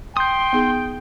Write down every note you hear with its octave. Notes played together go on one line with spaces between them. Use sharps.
G5 C6 D#6 G6
B3 D#4 G#4